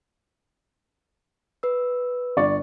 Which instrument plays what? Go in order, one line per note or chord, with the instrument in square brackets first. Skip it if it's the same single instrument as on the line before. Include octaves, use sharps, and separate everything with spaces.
[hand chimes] B4 E6
[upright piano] G1 D5 C#6